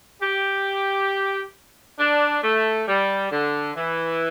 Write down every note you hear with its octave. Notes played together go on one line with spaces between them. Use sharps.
G4
D4
A3
G3
D3
E3